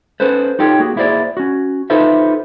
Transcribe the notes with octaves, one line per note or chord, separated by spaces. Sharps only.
C#4 A4 B4 C5
D#4 F4 G4 A4 C#5
A#3 F#4 G#4
A#3 E4 G#4 C5 D5
C#4 F#4
D#4 F4 A4 B4 C5 E5